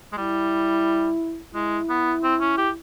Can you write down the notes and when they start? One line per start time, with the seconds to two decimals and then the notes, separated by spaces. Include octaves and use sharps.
0.12 G#3
0.17 G3 E4
1.55 G#3 E4
1.90 B3
2.23 C4
2.41 C#4
2.58 G4